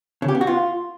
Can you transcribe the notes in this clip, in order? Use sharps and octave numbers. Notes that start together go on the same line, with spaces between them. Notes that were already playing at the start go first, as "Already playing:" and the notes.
C#3
G4
B3
F#4
F4